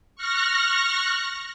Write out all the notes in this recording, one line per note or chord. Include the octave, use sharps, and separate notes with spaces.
C#6 F6 F#6 A#6